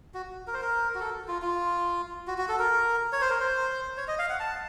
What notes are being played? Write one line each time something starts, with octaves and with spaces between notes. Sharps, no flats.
F#4
A#4
C5
A#4
F#4
A4
F4
F4
F#4
F#4
A4
A#4
C#5
C5
A#4
C5
C#5
D#5
F5
F#5
A5